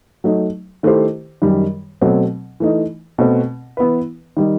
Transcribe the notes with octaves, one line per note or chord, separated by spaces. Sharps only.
F#3 A3 D#4
D#3 A3 E4 G4 C5
F#2 D#3 G3
B2 F#3 A3 C4
E3 A3 D#4
B2 A3 C4
E3 B3 E4 B4
D#3 G3 D#4